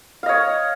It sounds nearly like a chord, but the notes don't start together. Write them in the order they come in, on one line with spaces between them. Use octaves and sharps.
F5 D#5 C#5